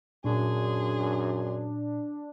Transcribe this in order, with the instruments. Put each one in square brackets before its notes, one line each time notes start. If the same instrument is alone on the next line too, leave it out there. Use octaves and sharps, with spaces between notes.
[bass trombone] F#2 [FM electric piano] A#2 [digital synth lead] D4 [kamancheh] G#4 C6